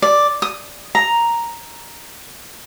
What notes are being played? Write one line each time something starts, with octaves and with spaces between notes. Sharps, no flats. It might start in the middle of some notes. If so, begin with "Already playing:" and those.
D5
D#6
A#5